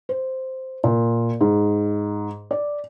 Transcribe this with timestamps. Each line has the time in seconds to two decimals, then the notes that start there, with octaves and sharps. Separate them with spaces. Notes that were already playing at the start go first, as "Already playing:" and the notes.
0.09 C5
0.84 A#2
1.41 G#2
2.51 D5